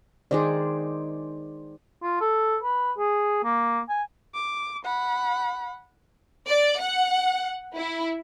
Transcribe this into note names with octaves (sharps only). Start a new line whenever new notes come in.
D#3 G#3 D#4 G#4 C5 D5
F4
A4
B4
G#4
A#3
G#5
D6
F#5 B5
D5
F#5
E4